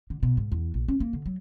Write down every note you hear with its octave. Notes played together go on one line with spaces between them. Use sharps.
D3
B2
G#2
E2
A#1
C#4
A#3
D3
F#3